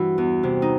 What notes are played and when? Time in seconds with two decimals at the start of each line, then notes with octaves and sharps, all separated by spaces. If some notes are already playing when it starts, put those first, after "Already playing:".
Already playing: G2 E3 E4 F#4
0.18 E2
0.43 C3
0.62 D#4